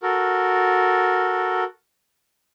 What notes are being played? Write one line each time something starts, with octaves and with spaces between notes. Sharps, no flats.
F#4 A4 A#4